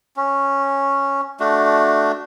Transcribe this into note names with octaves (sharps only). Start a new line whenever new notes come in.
C#4
A3 D4 F#4